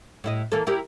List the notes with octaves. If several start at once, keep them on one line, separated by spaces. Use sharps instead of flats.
A2 E4 D#5
E3 A#3 A4
E4 G4 A#4